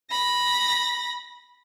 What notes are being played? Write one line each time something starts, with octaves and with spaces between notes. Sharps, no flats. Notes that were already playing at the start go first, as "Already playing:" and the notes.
B5 A#6